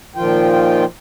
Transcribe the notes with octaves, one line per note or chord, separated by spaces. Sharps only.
A#2 D#3 F3 F4 G5